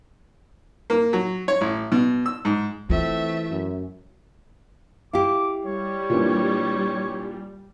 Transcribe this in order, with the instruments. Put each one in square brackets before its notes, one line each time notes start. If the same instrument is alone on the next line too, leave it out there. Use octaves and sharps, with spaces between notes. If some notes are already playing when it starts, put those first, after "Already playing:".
[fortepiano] A#3
F#3
C#5
A1
B2
E6
G#2
[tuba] E3 [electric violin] A3 E5 [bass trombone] C4 [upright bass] F4
[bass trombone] F#2
[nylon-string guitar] E4 G4 [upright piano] F5 [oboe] D6
[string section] G3 [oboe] C#5
[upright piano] A#2 E3 D4